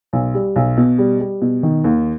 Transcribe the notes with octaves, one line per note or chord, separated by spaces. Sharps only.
B1
G3
B1
B2
G3
G3
B2
D#3
D#2